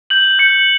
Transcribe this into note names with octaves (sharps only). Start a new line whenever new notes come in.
G6 F#7
G6 C#7